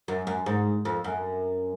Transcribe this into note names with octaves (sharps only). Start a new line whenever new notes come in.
F#2
F#2
G#2
F2
F#2